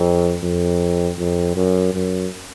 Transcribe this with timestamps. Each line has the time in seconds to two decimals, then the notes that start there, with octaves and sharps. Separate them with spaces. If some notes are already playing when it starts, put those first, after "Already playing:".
Already playing: F2
0.43 F2
1.19 F2
1.56 F#2
1.94 F#2